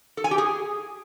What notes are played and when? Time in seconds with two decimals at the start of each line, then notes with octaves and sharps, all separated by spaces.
0.17 A4
0.24 G#5
0.31 G4
0.38 G#4